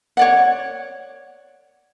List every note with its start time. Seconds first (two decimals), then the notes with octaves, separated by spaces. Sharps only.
0.17 C#5 D5 F#5